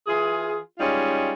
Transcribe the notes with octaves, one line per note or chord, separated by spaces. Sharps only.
E3 F4 G#4
G3 G#3 C#4 D#4 F4